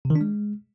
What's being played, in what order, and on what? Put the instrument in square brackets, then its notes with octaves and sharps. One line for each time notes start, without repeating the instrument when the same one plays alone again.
[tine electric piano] C3
D#3
D4
G#3